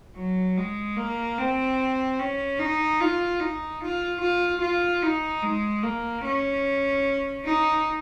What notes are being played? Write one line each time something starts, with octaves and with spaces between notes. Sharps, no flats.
F#3
G#3
A#3
C4
C#4
D#4
F4
D#4
F4
F4
F4
D#4
G#3
A#3
C#4
D#4